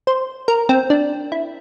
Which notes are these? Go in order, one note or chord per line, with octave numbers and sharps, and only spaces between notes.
C5
A#4
C4
D4
E4